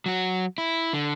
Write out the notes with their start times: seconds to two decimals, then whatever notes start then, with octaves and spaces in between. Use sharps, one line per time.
0.06 F#3 F#4
0.58 E4
0.93 D3